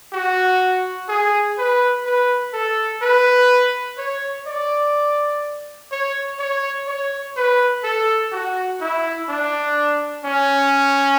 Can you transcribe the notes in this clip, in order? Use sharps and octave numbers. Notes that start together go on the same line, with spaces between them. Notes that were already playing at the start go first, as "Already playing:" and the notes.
F#4
G#4
B4
B4
A4
B4
C#5
D5
C#5
C#5
C#5
B4
A4
F#4
E4
D4
C#4